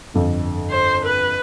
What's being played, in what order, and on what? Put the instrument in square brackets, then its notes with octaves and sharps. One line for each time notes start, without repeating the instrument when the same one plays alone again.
[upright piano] G1 F2
[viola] C5
B4